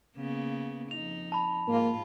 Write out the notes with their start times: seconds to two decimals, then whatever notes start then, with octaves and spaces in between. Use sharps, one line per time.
0.17 C#3 A#3 B3
0.91 F2 D#4 F7
1.32 A5 B5
1.68 G#2 A#3 F4